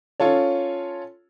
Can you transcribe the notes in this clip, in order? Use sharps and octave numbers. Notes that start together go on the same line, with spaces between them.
C#4 F4 A4 C#5